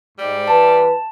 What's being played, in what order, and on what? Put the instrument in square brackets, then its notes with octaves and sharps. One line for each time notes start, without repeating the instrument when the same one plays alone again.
[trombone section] G#2 [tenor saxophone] G3
[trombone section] E3 B4 [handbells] A5